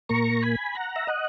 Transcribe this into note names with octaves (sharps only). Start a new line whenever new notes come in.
A#2 A#3 A#5 C#6
G#5 B5
F#5 A#5
E5
D#5 F#5